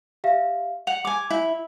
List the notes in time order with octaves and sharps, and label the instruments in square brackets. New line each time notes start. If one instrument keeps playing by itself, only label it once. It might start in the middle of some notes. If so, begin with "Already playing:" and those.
[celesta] G4 E5 F5
[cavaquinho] F#5 [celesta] F7
[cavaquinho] G#5 D6
E4